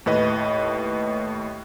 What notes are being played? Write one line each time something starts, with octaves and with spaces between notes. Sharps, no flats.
D#2 A2 B4 D#5